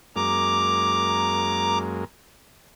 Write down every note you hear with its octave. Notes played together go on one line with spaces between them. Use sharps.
F#2 G#3 A#3 A#5 D6